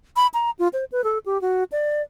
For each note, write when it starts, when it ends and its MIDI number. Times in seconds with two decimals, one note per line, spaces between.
0.16 0.27 83
0.34 0.50 82
0.59 0.68 65
0.73 0.85 72
0.92 1.04 71
1.04 1.18 69
1.26 1.40 67
1.41 1.64 66
1.72 2.02 74